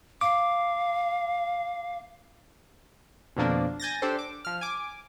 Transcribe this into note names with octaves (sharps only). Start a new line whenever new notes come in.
F5 D6
F2 B2 D3 F3 A#3 D4
G#5 G6 A6 A#6
D4 G4 A4 C5
D6
F3 F6
G#5 D6